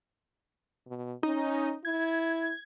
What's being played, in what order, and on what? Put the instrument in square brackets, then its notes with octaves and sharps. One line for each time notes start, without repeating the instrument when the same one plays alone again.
[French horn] B2
[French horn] C#4 [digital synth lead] D#4
[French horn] E4 [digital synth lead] G#6